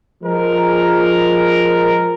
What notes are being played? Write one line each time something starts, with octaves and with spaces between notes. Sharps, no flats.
F3 G#3 A#4